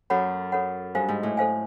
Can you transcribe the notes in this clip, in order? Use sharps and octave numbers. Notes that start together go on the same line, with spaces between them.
F#2 A4 C#5 F#5 B5
A4 C#5 F#5 B5
G2 A4 C5 F5 G#5
G#2
A2
A4 C5 F5 G#5